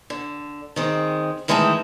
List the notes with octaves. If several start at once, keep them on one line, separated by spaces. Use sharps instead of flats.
D3
D#3 G#3 C4
D#3 E3 G#3 A3 C4 A4